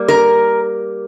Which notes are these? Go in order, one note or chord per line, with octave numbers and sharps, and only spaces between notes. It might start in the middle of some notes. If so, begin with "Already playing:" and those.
Already playing: G3 A#3
A#4